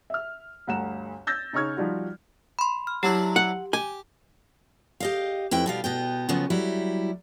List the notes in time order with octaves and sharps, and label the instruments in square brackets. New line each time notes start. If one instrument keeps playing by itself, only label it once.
[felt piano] E5 F6
G1 D2 F#5 A#5 E7
E6 G6 A6 A#6
C#3 D#4 C#5 C#6 F6 G#6
F3 G3 D#4 F4 F#4
[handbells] B5 C6
F6
[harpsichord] F#3 D4 E4 [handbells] G4
[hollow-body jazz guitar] F#5
[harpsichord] G4 [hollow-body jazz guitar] G#5
[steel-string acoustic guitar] G4 D#5 F5
F2 E4 B4 G5
B2 G3 F5
B2 B3 G5
C#3 F3 F#3 B3
F#3 G3 E4